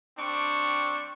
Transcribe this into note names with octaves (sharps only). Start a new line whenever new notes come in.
G3 C4 D4 C#6